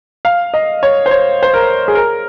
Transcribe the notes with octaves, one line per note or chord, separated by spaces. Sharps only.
F5
D#5
C#5
C5
C#5
C5
A#4
G#4
A#4